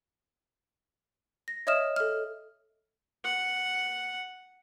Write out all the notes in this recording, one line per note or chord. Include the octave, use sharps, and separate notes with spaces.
A#6
C#5 D#5 E5 D#6 F6 E7
A4 F6
F#5